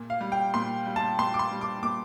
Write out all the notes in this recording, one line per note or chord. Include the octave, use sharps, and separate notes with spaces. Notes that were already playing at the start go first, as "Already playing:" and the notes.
Already playing: A#2
F5
G3
G5
A#2 C6
G3
A5
A#2 C6
D6
C6
G3
D6
A#2 D6